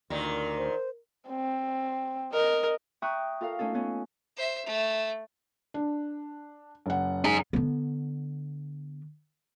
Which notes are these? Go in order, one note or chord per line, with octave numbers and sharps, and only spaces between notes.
D2 A#2 D#3 A#4
C5
C4
A#4 D#5
E5 G5 A#5 C#6 D#6 F#6
F4 A4 A#4 F5
A3 C#4 D#4 A4
B3 C#4 D#4
C5 E5
A3
D4
F#1 F#5
D#4 G#4
D3 B3